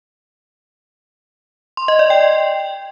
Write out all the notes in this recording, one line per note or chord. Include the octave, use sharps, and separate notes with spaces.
C6
D#5
D5
G5